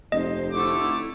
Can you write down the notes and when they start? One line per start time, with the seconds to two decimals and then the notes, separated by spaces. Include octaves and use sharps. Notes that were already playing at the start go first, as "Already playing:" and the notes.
0.12 F1 D#4 C5 D#5
0.52 D3 A3 E4 D6